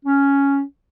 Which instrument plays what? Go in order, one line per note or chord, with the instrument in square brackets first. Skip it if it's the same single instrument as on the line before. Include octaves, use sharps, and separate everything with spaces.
[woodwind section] C#4